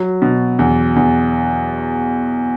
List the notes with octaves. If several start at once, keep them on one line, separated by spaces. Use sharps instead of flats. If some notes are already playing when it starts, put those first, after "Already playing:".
Already playing: F#3
B2
E2
E2